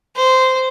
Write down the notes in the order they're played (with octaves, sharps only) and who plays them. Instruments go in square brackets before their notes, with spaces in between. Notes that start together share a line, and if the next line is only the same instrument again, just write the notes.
[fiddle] C5